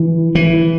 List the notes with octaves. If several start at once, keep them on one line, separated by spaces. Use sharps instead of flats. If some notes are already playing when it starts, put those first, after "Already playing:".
Already playing: E3
E3